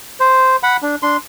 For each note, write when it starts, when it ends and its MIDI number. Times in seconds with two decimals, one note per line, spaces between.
0.20 0.56 72
0.63 0.77 78
0.63 0.77 83
0.82 0.96 62
1.03 1.17 62
1.03 1.17 84